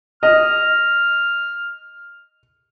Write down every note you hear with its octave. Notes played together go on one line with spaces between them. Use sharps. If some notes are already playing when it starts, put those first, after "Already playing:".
D#5 F6